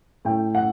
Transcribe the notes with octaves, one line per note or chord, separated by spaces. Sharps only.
A2 G5
F#5